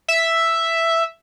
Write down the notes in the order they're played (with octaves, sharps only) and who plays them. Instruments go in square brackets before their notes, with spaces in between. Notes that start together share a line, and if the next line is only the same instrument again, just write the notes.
[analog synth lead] E5